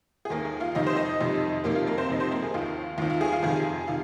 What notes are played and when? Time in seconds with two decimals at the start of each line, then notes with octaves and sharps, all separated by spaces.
0.25 G#4
0.30 D#2 D#3 A#3 A#4
0.45 G#4
0.60 F4 F5
0.75 F2 C3 D#3 D#5
0.86 C5
0.96 D#4 D#5
1.20 F2 C3 D#3
1.64 F2 C3 D#3 A#3 A#4
1.75 F4
1.87 A#3 A#4
1.98 C4 C5
2.09 F2 C3 D#3 D#5
2.20 C4 C5
2.31 A#3 A#4
2.42 G#4
2.54 D#2 D#3 F4
2.98 D#2 D#3 F4
3.10 F4
3.21 G#4
3.32 F4 F5
3.43 F2 C3 D#3 G#4
3.87 C3 D#3 F4 F5